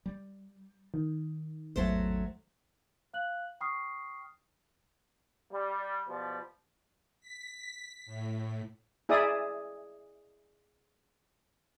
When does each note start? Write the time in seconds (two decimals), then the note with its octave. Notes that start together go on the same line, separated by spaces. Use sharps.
0.06 G3
0.94 D#3
1.76 A1 E2 G#2 F#3 A3 C5
3.13 F5 F#6 F#7
3.61 G5 B5 C#6 D#6 F6 C7
5.51 G3
6.07 B2 F3 G3
7.20 B6
8.06 A2
9.09 E4 G#4 D5 E5 D#6